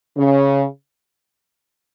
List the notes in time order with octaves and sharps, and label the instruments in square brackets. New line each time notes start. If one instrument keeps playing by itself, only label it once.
[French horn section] C#3